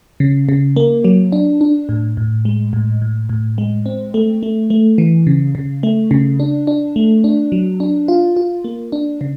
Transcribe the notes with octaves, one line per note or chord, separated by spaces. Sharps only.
C#3
C#3
A#3
F#3
D4
D4
A2
A2
G#3
A2
A2
A2
G#3
C4
A3
A3
A3
E3
C#3
C#3
A3
C#3
D4
D4
A3
D4
F#3
D4
F4
F4
A#3
D4
C#3